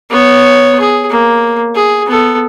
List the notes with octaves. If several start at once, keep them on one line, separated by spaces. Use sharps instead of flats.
B3 C#5
G#4
A#3
G#4
B3 A4